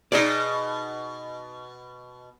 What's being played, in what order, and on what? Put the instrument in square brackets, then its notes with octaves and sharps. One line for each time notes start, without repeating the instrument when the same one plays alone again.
[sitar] B2 D#5 [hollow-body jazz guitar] D#4 G#4 D5